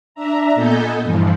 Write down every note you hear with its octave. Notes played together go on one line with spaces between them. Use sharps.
D4 E5 A#5
A#2 B3 A4 D#5 G#5 G6
G2 E3 F3